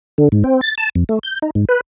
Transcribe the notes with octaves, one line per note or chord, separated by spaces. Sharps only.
D3
G#2
C4
A6
A5
F2
A3
G6
D#4
G#2
B4